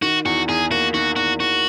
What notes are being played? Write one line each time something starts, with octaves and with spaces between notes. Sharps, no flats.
D#3 F#4
E2 F#4
E2 G#4
A#3 F#4
D#3 F#4
E2 F#4
E2 F#4